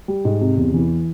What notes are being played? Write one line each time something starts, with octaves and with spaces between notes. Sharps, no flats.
G3
G#2
C3
E2
E3